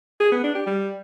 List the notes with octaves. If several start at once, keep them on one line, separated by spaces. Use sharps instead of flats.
G#4
B3
D4
G4
G3